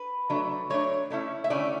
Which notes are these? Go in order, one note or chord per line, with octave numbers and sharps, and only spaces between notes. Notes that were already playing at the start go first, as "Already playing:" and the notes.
Already playing: B4
F#3 A3 D4
F#3 A3 D4 C#5
D3 A3 C#4 E4
E5
D3 A3 C#4 E4 D5